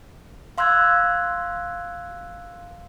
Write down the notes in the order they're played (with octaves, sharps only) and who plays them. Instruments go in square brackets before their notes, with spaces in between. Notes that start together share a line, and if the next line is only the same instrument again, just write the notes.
[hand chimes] F5 C6 E6 F#6 G#6